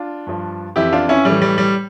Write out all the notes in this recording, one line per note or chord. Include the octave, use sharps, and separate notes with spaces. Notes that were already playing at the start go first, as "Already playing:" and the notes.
Already playing: D4 F4
G2 F3
F2 E3 E4 G4
D4 F4
C#4 E4
A2 E3 G3
G3
G3